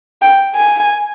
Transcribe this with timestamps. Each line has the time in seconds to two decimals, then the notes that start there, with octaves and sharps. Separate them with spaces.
0.22 G5
0.55 G#5